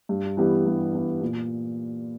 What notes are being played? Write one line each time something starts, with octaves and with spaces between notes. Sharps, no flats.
G2
E3 G3 B3
G2
E3 G3 B3
A#2